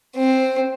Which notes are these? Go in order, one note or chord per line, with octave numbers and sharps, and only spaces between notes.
C4